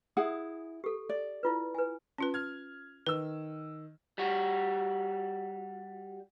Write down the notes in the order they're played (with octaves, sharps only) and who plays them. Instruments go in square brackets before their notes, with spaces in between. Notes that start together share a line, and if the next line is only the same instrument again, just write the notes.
[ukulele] E4 G#4 F#5 [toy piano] D#6
[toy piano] G4 A4
[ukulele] D5
[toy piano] E4 F4 B4
B4 G#5
[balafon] C#4 F4 B4
[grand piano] F6 G#6
[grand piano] D#3 E6 [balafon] B4
[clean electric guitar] G3 F#4